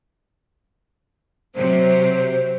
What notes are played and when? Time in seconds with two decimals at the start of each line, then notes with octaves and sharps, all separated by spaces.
1.56 C3 F#3 C5